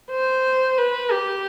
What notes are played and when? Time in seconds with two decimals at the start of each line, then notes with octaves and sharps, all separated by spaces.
0.12 C5
0.78 B4
1.11 G4